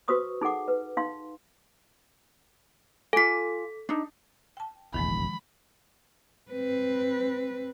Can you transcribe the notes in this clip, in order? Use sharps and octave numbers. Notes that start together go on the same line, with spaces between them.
F#4 B4 C5 C#6 D#6 E6
D#4 G#4 A4 F#5 D6
B4
D#4 F5 C6
F4 A4 G#5 B6
D4 D#4
G5 A5
F1 A#1 E2 D#3 F3 G#3 B5
C4 B4